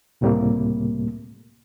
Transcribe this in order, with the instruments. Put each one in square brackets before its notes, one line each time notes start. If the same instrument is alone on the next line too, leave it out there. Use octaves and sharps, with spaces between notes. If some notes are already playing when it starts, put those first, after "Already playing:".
[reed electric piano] C#2 A2 C3 G3 A3 A#3